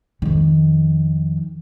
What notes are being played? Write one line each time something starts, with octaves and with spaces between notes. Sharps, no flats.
F2 D#3